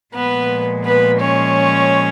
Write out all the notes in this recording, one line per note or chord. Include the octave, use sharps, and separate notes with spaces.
A#2 F3 G#3 B3 B4
B3 B4
C#4 C#5